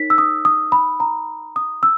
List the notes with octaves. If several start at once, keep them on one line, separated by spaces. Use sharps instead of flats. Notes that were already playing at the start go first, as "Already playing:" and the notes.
Already playing: D#4 A#4 C#5 B6
E6
D#6
D#6
B5
A#5
D#6
E6